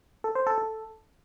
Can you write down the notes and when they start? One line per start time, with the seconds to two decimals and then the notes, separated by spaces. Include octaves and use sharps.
0.24 A4
0.35 C5
0.47 A4
0.58 A4